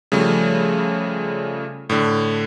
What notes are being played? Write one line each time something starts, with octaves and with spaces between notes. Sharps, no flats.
C#3 F3 G3 A3
A2 D3